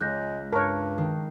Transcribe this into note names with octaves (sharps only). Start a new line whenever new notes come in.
C#2 G#3 F#6 G6 A#6
G2 A#4 C#5 A5 C#6 F#6
D#3 C7